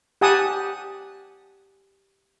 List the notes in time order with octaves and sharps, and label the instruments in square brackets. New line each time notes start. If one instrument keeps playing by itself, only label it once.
[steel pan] G4 F#5 G#5 A5 D#6